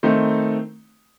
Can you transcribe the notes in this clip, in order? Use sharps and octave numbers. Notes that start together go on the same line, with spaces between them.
D#3 A3 C4 D#4